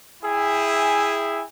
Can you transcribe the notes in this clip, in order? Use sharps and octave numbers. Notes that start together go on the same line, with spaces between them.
E4 G#4 E5 G5 G#5